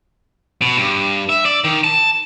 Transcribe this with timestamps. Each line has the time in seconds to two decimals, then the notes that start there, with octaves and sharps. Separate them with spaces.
0.61 B2
0.77 G2
1.29 E5
1.45 D5
1.64 D#3
1.84 A5